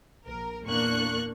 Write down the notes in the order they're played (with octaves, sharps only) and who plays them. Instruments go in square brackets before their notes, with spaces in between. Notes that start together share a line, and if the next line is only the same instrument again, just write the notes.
[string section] A#1 A#4
E2 A#2 A#3 D4 C#6 F#6